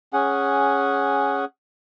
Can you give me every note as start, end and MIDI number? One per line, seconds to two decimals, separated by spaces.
0.13 1.45 61
0.13 1.45 68
0.13 1.45 78